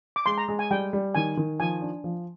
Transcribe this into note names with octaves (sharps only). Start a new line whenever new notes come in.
D6
G#3 C6
A#5
G#3
G#5
G3 G5
G3
D#3 G#5
D#3
F3 G#5
D4
F3